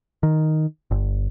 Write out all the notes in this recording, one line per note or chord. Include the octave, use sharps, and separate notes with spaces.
D#3
G1